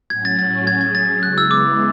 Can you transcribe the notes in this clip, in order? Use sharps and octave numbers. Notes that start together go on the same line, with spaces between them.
A2 F#3 C#4 F#4 G#6
A6
A6
F#3 C#4 G#4 G#6
G#6
A6
C#3 G#3 B3 E4 F#6
E6
D6